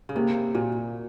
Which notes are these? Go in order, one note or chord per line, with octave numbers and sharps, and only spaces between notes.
C#3
C3 A#3
A#2 F#4